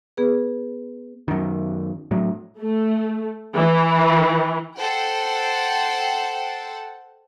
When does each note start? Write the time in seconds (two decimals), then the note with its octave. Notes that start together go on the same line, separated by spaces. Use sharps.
0.17 B3 G#4 B4
1.28 F#2 D#3
2.11 A2 F#3
2.60 A3
3.55 E3
4.77 A4 C5 F#5 G5